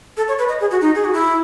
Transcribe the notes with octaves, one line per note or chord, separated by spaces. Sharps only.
A4
C#5
B4
D#5
G#4
F#4
D#4
G#4
F#4
E4